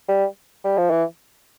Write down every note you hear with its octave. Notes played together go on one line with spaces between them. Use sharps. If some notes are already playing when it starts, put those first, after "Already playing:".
G3
G3
F3
E3